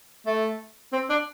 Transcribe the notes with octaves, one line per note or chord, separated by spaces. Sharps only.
A3
C4
D4